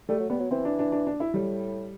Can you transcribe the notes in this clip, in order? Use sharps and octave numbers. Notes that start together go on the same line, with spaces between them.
G3 A3
F#3
G3 B3
F#3
E3 C4
D4
D4
D4
D4
E4
A2 G3